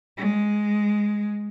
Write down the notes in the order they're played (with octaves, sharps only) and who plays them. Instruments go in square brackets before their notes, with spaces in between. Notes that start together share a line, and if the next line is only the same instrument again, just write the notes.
[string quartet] G#3